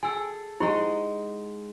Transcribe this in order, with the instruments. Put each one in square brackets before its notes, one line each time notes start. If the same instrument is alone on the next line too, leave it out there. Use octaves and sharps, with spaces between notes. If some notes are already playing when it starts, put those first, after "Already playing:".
[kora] G#4 A4 [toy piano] G#5 E6
[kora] G#3 D#4 F#5 [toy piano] E4 G4